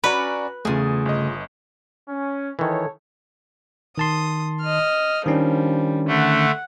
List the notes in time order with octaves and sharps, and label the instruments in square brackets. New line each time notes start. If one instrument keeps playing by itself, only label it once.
[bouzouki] C#4 D5 A#5 [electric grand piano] F#4 B5 [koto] B4
[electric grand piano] E2 D#6 [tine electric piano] C#3 A3 [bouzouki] F4 G#4
[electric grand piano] G1 D#5
[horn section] C#4
[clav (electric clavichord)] D#3 E3 [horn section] A4 C#5
[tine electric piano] D#3 A5 C6 [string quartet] D#6
[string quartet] D#5 F6
[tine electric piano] D#3 C#4 D4 [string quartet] F3 G3
[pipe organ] D3 A3 [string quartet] F#5